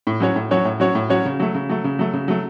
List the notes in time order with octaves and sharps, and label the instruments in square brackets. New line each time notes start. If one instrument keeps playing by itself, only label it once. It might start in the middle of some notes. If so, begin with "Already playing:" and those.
[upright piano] A2
F#3 C#4 F#4 C#5
A2
F#3 C#4 F#4 C#5
A2
F#3 C#4 F#4 C#5
A2
F#3 C#4 F#4 C#5
C#3
F#3 A3
C#3
F#3 A3
C#3
F#3 A3
C#3
F#3 A3